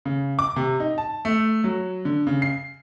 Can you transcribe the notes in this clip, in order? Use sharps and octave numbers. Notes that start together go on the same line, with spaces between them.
C#3
D6
C3
D#4
A5
A3
F#3
D3
C#3
C7